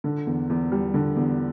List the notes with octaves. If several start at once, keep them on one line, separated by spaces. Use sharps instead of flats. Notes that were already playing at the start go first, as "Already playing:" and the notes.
D3
E2
E2
G3
D3
E2